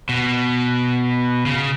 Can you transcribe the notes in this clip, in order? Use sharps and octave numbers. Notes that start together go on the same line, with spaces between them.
B2
C#3